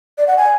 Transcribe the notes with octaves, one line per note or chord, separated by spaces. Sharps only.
D5
F#5
G#5